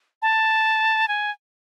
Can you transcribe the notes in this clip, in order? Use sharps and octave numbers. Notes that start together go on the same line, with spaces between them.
A5
G#5